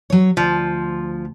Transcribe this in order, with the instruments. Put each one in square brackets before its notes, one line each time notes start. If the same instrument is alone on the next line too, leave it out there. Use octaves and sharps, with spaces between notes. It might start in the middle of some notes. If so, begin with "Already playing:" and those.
[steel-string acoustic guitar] F#3 C#5
[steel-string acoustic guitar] D2 [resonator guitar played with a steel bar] F3